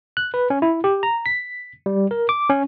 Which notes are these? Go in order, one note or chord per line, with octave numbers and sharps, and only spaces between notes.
F#6
B4
C#4
E4
G4
A#5
B6
G3
A#4
D6
C#4